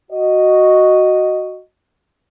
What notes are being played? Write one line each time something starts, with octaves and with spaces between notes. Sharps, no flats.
F#4 D#5